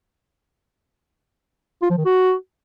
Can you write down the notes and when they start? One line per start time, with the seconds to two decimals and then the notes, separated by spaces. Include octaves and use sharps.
1.82 F4
1.90 F3
1.98 D#3
2.06 F#4